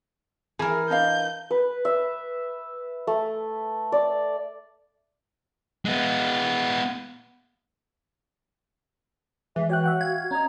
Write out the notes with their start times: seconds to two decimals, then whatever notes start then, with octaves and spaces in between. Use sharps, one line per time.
0.59 E3 G#4 A#4
0.90 D4 D#5 F5 G6
1.50 B4
1.85 E5
3.07 A3
3.92 D5
5.85 G#3 B3
9.56 E3 G#3 E5
9.69 F#4 C#5 G5 F#6
9.84 E5 F#5 G5
10.01 F5 G#6
10.31 C#4 D#5 A#5